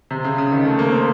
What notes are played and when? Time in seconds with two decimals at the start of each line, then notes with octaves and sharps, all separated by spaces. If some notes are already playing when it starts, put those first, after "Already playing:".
0.11 C3
0.24 C#3
0.38 C#3
0.51 D#3
0.65 A3
0.79 A#3
0.92 C4